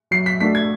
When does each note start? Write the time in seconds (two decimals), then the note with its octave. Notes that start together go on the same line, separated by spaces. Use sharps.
0.11 F#3 C7
0.26 B6
0.40 A3 D4 F#4 A4 B6
0.55 G#6